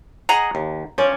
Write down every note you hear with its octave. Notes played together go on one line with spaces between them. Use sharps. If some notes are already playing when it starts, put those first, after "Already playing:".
G#4 D#5 F#5 A#5
D#2
F3 C#4 C#5 D5